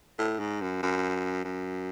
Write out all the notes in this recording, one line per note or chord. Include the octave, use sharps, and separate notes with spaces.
A2
G#2
F#2
F#2
F#2